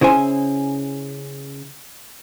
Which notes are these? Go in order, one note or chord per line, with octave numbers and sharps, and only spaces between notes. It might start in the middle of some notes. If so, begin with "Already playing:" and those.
C#3 E4 C5 G#5